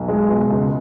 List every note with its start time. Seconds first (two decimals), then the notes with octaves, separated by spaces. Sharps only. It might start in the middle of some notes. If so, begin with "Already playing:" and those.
Already playing: B1
0.08 G#3
0.29 B2
0.50 C#2